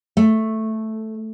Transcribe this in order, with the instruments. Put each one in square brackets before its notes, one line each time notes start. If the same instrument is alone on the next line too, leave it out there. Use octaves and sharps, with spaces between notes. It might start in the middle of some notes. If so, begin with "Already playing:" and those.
[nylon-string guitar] A3